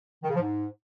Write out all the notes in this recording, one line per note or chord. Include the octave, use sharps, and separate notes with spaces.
D#3
C#3
F3
G#2